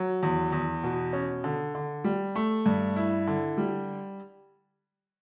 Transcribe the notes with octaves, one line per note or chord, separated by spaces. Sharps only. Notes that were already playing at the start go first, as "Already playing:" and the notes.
Already playing: F#3
E2
E2
B2
C#4
D3
D3
G3
A3
G2
E4
D3
G3